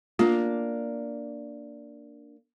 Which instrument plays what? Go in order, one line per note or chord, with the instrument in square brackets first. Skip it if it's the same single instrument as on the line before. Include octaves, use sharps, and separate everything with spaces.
[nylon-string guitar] A#3 D4 [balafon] F4